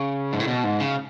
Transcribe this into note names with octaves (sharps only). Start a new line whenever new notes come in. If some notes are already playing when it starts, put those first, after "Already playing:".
Already playing: C#3
G#2
A2
B2
G#2
C#3